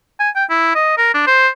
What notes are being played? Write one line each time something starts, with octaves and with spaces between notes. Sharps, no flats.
G#5
G5
E4
D#5
A#4
D4
C5